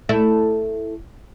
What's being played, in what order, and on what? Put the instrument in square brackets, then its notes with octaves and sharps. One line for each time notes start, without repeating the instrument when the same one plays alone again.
[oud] A3 E4